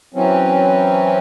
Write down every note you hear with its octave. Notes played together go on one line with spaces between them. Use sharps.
E3 F#3 C4 C#4